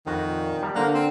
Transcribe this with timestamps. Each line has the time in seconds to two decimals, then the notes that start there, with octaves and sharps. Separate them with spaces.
0.07 F2 D#3 F#4 G5
0.24 A#2
0.62 G3 G5 A5 A#5
0.75 D3 A#3 A#4 C5 F#5
0.94 C4